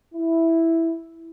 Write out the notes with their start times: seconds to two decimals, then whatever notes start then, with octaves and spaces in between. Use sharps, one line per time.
0.15 E4